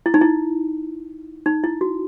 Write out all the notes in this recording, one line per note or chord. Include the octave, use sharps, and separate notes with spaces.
E4
D#4
E4
D#4
E4
F#4